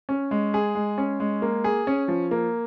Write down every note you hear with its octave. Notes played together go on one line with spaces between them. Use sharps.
C#4
G#3
G#4
G#3
C#4
G#3
A#3
G#4
C#4
F3
A#3